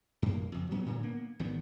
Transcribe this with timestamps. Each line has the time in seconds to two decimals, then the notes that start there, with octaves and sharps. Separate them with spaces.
0.22 F#2 A#3
0.52 F#1 F2
0.71 D1 F#3 B3 C#4
0.86 A2 D3
1.03 A#3 B3
1.39 G#1 D#3 B3